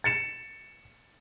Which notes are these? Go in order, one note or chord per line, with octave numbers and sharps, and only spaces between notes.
A6 C#7 E7